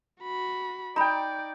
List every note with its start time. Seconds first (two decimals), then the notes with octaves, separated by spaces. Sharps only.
0.21 F#4 B5
0.96 D#4 D5 G5 A#5 B5